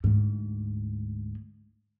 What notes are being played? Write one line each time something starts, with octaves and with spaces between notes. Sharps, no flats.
D2 G#2